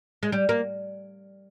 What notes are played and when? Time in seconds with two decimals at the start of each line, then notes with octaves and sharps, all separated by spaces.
0.23 G#3
0.32 G3
0.49 A#3